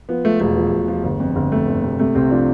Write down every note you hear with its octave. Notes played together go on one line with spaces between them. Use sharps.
F3 B3
F3 A3
E1 A3
F3
E1
F3
G1
F2
G1
F2 A3
G1
C3
C3 A3
C2 C4
F3 D4